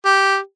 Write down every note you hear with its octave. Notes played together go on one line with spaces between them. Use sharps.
G4